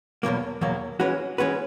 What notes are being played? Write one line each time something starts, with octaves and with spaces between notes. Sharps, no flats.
E2 B2 F#3 A#3
E2 B2 F#3 A#3
E3 G#3 C#4 F#4 B4
E3 G#3 C#4 F#4 B4